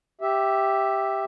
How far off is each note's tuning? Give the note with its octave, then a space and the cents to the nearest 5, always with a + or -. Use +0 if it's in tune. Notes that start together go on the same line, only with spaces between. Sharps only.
G4 +0 E5 +0